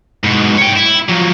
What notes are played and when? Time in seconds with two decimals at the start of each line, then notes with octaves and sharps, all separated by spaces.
0.25 G#2 B2
0.58 C#5 G5
0.77 E4
1.09 F3 F#3